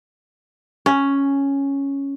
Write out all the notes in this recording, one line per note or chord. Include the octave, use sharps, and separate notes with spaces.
C#4